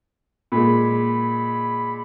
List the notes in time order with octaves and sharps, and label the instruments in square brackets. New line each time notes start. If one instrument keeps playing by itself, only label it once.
[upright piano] A#2 G#3 [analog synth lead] B5